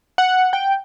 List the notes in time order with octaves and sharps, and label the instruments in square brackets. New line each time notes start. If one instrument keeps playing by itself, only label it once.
[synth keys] F#5
G5